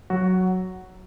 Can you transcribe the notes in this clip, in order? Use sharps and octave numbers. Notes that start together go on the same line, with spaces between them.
F#3 F#4